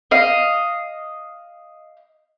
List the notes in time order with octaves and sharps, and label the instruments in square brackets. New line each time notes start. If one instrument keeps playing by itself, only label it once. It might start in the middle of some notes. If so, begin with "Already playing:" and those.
[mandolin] D#5 F5